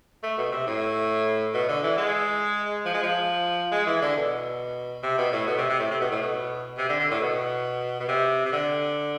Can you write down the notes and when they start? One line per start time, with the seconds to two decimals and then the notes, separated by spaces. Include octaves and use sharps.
0.23 A3
0.38 B2
0.52 C3
0.67 A2
1.54 B2
1.69 D3
1.83 E3
1.98 G#3
2.85 F3
2.94 G#3
3.03 F3
3.72 G#3
3.87 E3
4.02 D3
4.16 B2
5.03 C3
5.18 B2
5.32 A2
5.47 B2
5.58 C3
5.69 C3
5.80 A2
5.91 C3
6.01 B2
6.11 A2
6.22 B2
6.78 C3
6.89 D3
7.00 D3
7.11 A2
7.21 B2
8.00 B2
8.08 C3
8.45 C3
8.53 D3